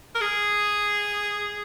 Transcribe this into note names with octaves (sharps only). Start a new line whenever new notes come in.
A#4
G#4